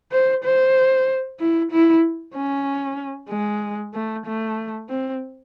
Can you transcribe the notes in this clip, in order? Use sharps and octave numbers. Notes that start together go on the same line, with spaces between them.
C5
C5
E4
E4
C#4
G#3
A3
A3
C4